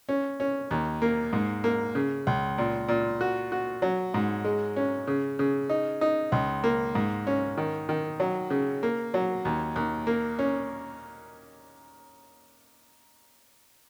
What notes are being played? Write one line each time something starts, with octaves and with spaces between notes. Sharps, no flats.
C#4
C#4
D#2
A#3
G#2
A#3
C#3
C#2
A#2
A#2
F#4
F#4
F#3
G#2
G#3
C#4
C#3
C#3
D#4
D#4
C#2
A#3
G#2
C#4
D#3
D#3
F#3
C#3
A#3
F#3
D#2
D#2
A#3
C#4